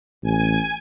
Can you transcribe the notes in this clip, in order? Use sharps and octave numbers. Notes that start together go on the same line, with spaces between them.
A1 G#5